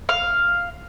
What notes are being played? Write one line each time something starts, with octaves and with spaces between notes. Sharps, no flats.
F5